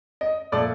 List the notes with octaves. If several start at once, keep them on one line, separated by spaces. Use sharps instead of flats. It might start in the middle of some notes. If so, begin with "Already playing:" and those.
D#5
A#2 F3 A3 D5